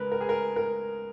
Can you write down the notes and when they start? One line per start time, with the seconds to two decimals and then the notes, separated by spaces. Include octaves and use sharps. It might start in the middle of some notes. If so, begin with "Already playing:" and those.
Already playing: C#3 G#3 A#4 B4
0.12 A#4
0.21 G#4
0.29 A#4
0.56 A#4